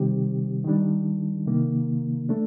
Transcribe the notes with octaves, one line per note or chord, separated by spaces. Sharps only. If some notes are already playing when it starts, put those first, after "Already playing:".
Already playing: C3 D#3 G3 C4 G4
D#3 G3 D4
C3 D#3 A#3
A3 D4